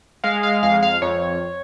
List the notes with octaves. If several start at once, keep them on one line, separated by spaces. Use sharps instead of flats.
G#3 F5
F5
F2 F5
F5
F2 C#5